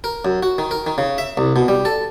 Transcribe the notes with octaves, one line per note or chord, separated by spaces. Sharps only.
A#4
F#2
F#4
D#3
A#4
D#3
C#3
E5
C2
B2
G3
A4